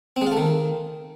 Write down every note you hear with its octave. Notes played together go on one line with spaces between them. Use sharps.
C4
G#3
F4
A3
D#3